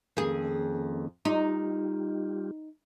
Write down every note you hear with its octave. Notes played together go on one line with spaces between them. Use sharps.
F2 D#3 A#3 C#4 G#4
G3 D#4 F4 G4